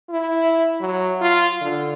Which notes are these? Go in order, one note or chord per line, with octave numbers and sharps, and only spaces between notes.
E4
F#3
F4
D3